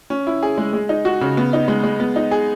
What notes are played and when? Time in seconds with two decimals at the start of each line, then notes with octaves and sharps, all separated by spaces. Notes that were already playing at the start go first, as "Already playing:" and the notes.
0.10 C#4
0.27 E4
0.43 G#4
0.58 G#3
0.73 G#3
0.89 D#4
1.05 F#4
1.21 C#3
1.37 B3
1.53 D#4
1.68 G#3
1.84 G#3
2.00 B3
2.16 D#4
2.31 G#4